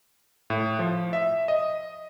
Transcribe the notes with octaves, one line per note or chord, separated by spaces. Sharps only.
A2
F3
E5
D#5